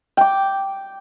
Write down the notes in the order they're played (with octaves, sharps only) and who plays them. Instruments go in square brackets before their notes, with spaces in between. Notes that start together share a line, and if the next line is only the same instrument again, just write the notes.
[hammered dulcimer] G5 D6